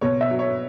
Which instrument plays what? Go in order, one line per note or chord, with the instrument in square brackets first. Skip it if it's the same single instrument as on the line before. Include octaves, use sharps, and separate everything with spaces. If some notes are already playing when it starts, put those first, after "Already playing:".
[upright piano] B2 C#5
E5
F#3
C#5